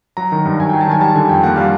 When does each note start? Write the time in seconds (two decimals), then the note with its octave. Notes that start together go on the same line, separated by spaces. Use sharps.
0.17 F#3 A#5
0.32 D#3
0.45 G2
0.59 G2 G#5
0.69 F#3 G5
0.81 A5
0.88 D#3 G#5
1.01 G3 A5
1.15 D3 G#5
1.29 F2 G5
1.43 A#3 F#5
1.56 G3 F5